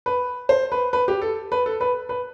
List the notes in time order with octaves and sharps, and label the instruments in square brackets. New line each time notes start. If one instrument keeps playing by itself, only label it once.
[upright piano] B4
C5
B4
B4
G4
A4
B4
A4
B4
B4